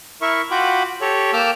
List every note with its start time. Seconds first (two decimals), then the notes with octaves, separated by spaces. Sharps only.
0.21 E4 A#4 E5 C#6
0.51 F4 F#4 F#5 G5 B5 D6
1.01 G4 A4 C#5
1.33 A#3 G5 A5 D6 E6 F6